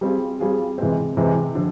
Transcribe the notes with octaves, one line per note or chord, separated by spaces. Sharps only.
G3 C4 F4 G#4
G3 C4 F4 G#4
C3 E3 G#3 C4
C3 E3 G#3 C4
D3 F3